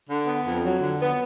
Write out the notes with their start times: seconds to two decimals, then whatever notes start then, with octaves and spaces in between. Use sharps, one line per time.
0.08 D3
0.26 B3
0.45 F2
0.63 F#3
0.81 D3
1.00 B3